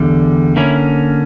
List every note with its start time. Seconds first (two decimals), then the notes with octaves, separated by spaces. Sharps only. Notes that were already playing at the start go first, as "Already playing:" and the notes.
Already playing: E2 D3 G3
0.56 D3 A#3 C#4 E4